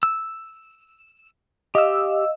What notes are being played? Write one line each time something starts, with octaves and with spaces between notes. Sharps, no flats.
E6
G4 D#5 F5 E6